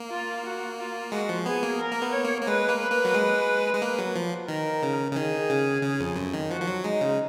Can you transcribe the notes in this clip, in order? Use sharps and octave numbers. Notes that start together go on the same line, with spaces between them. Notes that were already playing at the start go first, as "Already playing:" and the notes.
Already playing: A#3
F4
F#4
F4
G#3 F#4
F3
B3 G#4
A#3
A#4
A#3
B3
C#5
A#3
A#3
G#3 B4
A#3
B4
A#3
F#3
G#3
G#3
A#3
F#3
F3
D#3 A#4
C#3
C#3
D#3 G#4
C#3
C#3
F2
F#2
D#3
F3 F#4
F3
F#3
G#3 D#4
C#3